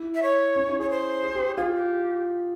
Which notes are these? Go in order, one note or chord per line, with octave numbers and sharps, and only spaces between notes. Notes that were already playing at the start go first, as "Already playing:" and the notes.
Already playing: E4
E5
C#5
C#4
E4
G#4 C#5
C5
G#4
G4
F4 G#4
G#4
G4